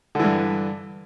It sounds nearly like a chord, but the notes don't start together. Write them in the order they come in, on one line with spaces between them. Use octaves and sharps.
D3 E3 G2